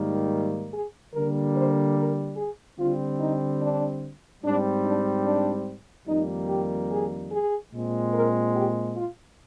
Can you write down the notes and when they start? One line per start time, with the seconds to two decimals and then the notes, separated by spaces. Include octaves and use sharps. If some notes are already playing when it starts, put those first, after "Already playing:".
Already playing: G#2 D#3 G3 A#3
0.73 G#4
1.14 D3 G3 A#3 A#4
1.55 C5
1.96 A#4
2.37 G#4
2.78 D3 G3 C4 F4
3.19 D#4
3.61 D4
4.43 G#2 G3 C4 D4
4.85 D4
5.26 D4
6.07 F2 D#3 G3 A#3 D#4
6.49 G4
6.91 G#4
7.31 G#4
7.72 A#2 G#3 C4
8.14 A#4
8.55 G4
8.96 F4